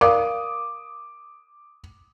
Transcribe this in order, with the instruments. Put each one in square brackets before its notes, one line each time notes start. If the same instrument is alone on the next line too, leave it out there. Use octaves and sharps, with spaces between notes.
[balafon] A#4 D5 F5 [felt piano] D6 D#6